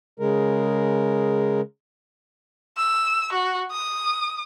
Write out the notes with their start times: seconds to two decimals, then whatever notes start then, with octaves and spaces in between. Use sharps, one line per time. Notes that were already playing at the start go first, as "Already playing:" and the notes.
0.20 C#3 G#3 A#4
2.77 E6
3.33 F#4
3.71 D#6